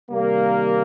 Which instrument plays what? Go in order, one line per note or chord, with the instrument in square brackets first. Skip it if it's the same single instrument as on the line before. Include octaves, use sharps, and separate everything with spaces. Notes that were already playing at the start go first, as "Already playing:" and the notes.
[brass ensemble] C3 D#3 G3 A#3